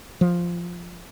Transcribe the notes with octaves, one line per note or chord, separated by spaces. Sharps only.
F3